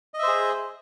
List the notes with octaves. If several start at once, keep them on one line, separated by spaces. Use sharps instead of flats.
G#4 C5 D#5 E5